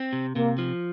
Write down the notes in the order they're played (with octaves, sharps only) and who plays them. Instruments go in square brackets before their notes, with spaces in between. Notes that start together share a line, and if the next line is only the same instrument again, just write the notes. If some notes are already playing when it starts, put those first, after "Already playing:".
Already playing: [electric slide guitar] C4
C3
[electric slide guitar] C3 [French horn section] A#3
[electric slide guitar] F3